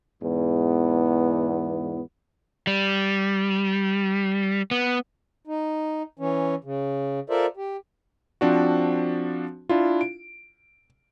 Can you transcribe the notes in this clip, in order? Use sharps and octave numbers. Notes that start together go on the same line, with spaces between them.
E2 G#2 E3 B3
G3
B3
D#4
E3 C#4
C#3
F4 A4 A#4 C5 D5 E5
G4
F3 C4 D4 F#4
D4 E4 F4
D7